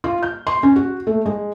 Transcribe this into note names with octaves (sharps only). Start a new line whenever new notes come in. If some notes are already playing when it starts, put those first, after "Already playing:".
F4
G6
C6
C#4
F#4
A3
G#3